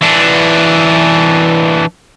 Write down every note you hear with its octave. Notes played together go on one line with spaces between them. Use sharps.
E3 D4